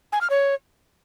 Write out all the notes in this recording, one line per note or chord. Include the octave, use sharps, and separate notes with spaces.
G#5
F6
C#5